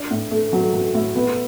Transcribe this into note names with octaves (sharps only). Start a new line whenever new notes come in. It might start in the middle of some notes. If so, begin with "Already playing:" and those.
Already playing: D4
A2
A3
F#3
F#3
A2
B3